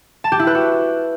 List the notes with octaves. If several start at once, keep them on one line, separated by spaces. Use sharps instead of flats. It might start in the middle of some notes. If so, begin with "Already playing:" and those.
A5
G4
E4
B4
F#4